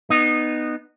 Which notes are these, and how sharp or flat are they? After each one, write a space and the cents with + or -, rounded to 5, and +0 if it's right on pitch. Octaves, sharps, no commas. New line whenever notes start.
B3 +0 D#4 -20